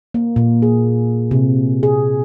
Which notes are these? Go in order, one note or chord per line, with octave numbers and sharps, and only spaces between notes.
A#3
A#2
G#4
C3
G#4